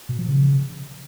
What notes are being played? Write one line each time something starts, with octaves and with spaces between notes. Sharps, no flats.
B2
F3
C#3